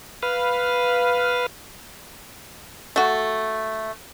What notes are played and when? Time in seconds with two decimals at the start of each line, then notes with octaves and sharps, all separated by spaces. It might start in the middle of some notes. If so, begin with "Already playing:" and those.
0.23 B4 F5
2.96 A3 F#4